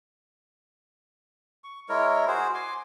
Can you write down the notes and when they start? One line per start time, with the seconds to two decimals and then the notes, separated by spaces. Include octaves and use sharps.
1.64 C#6
1.89 G#3 E4 A#4 C#5
2.28 F#4 G#4 C5
2.54 G#5 C6 D6